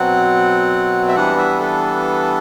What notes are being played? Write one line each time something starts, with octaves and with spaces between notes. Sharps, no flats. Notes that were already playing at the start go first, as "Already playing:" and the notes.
Already playing: B2 F#3 C4 F#5
E5
E3 G3 B3 D4 F#5
E5
A4